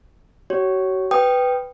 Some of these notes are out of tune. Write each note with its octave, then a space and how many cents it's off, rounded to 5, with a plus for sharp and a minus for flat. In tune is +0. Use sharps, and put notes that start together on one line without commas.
F#4 +40 C#5 +0
B4 +10 G5 +0 D#6 -15